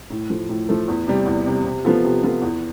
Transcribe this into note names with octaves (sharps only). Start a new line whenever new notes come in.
A2
F3 A3
A2
F3 A3
E2
C3 G3
E2
C3 G3
C3
F3 B3 F4 A4
C3
F3 B3 F4 A4
E2